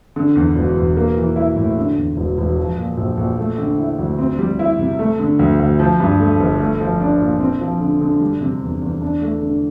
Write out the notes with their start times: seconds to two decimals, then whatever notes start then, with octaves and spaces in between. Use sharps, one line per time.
0.16 D3
0.35 E2
0.56 E1
0.76 E1
0.97 A#3
1.17 E3
1.36 E4
1.56 A2
1.77 D3
1.97 E2
2.17 E1
2.38 E1
2.57 F3
2.77 A#2
2.98 A#1
3.17 A#1
3.38 A3
3.58 D3
3.78 E4
3.99 D2
4.18 C4
4.38 G3
4.59 E4
4.79 C3
4.99 A3
5.20 D3
5.39 D2
5.60 D2
5.79 F3
6.00 G2
6.20 A3
6.40 G1
6.60 A3
6.81 F3
7.00 D4
7.21 A#2
7.40 C4
7.61 F3
7.80 D3
8.01 D3
8.21 G3
8.41 C3
8.62 E2
8.82 E2
9.02 D4
9.22 A3
9.42 D3